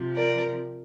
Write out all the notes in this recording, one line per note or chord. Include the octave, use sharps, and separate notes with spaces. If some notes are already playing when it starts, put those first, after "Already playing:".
Already playing: C3 F3
A#4 D5